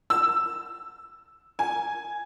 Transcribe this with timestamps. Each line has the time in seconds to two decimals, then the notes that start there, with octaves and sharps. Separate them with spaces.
0.10 E6
1.59 G#5